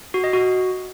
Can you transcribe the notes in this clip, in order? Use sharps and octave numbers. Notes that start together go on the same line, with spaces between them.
F#4
D#5
F#4